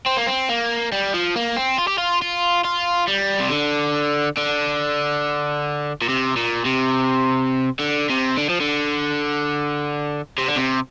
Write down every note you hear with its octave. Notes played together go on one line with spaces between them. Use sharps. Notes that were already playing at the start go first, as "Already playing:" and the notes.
C4
A#3
C4
A#3
G3
F3
A#3
C4
F4
G4
F4
F4
F4
G3
C3
D3
D3
A#2
C3
A#2
C3
D3
C3
D3
F3
D3
C3
D3
C3